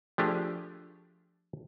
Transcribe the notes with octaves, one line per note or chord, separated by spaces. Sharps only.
F3 A3 D4 G4 G#4